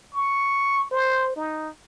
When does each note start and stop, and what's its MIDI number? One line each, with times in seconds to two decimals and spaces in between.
0.14 0.91 85
0.91 1.33 72
1.36 1.69 63